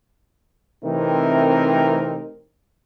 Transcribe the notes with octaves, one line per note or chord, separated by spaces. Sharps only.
C3 E3 A3 C4 D#4 A#4